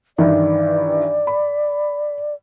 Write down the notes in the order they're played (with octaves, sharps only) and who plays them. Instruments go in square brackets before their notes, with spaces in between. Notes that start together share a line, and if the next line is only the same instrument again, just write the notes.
[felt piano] G2 D#3 E3 [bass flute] D5
[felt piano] B5